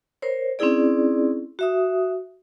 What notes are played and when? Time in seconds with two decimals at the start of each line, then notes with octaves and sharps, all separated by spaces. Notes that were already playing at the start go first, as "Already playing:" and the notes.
0.22 A#4 C5 C#5
0.59 C4 C#4 D#4 E4 G#4 D5
1.59 F#4 E5 D#6